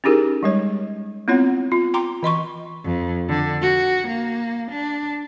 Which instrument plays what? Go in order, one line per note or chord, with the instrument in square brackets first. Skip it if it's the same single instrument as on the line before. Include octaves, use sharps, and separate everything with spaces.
[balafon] C#4 D#4 E4 G4 G#4 A#4
G3 G#3 C#5
B3 C4 E4 F4 C#5
F4
G5 A#5 C6 D6
E3 D#5 C6 C#6
[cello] F2
D3
F#4
A#3
D4